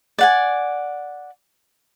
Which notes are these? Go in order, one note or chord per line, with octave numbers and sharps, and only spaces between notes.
D5 F#5 G#5